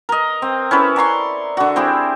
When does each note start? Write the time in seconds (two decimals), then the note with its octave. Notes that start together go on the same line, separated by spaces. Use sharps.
0.09 A#4 D#5
0.42 C4
0.71 C#4 E4 A4 B4
0.96 D5 A#5 C6 C#6
1.57 D3 F#4
1.76 C4 E4 G4 G#4